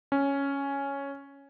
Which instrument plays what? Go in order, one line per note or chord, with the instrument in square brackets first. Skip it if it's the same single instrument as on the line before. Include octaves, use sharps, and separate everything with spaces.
[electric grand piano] C#4